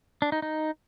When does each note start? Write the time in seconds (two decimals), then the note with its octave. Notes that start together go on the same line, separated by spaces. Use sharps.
0.22 D4
0.32 D#4
0.42 D#4